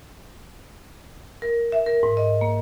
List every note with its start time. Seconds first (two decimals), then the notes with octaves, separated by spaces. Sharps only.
1.42 A#4
1.72 E5
1.86 A#4
2.03 G#2
2.17 D#5
2.41 A#3